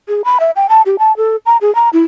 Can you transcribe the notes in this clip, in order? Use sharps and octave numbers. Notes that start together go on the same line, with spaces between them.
G#4
B5
E5
G5
A5
G4
A5
A4
A#5
G#4
A#5
E4